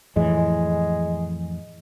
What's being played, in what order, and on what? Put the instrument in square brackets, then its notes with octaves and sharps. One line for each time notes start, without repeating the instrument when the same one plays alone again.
[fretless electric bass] F2 A2 E3 [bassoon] G#3